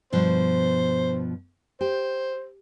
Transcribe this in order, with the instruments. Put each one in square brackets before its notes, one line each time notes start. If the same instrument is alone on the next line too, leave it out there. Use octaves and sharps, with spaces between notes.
[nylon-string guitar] G2 B2 F3 [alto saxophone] C5
[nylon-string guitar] G4 [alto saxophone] C5